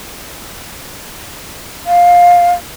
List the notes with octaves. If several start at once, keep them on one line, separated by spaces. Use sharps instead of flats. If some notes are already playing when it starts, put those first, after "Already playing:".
F5